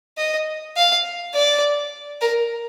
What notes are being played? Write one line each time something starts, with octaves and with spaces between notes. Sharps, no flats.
D#5
F5
D5
A#4